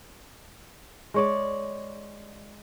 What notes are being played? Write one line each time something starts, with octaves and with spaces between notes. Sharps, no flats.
G#3 C#5 D5